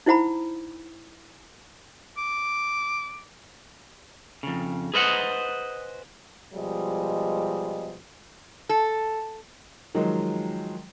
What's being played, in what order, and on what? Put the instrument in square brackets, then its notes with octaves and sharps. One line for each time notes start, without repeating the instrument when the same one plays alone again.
[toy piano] D#4 E4 C5 F#5 A#5 B5
[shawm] D6
[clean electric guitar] F2 C#3
G#4 B4 C5 D#5 F5 F#5
[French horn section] B2 F3 G3 G#3 D#5
[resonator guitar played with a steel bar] A4
[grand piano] D#3 F3 F#3 G#3